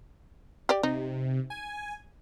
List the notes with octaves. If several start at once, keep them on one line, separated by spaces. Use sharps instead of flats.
G4 D5
C3 D#4
G#5